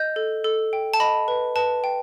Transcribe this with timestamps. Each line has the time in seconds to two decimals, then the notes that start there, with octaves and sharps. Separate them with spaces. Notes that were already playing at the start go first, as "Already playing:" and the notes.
Already playing: D#5 G6
0.16 A4
0.44 A4
0.73 G5
0.94 A5
1.00 D#5 B5
1.28 B4
1.56 B4 A5
1.84 G5